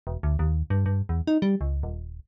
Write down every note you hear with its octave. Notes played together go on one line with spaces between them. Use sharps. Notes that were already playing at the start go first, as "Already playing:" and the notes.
E1
D2
D#2
G2
G2
E2
D#4
G3
C#2
D#1